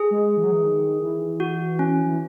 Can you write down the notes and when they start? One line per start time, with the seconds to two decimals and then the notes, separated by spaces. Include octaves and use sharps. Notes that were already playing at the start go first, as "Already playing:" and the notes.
Already playing: G#4
0.11 G#3
0.37 E3
0.43 F#3
0.52 E3
0.63 D#3
1.02 E3
1.40 F#4
1.79 C#4
2.06 E3